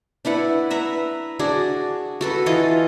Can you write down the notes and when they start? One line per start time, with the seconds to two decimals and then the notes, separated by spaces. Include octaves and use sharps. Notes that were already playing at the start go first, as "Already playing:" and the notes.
0.25 D4 E4 B4 F#5
0.70 B4 E5 A#5
1.39 D4 F#4 G#4
2.21 F#4 A4 B4
2.46 E3 F4 D#5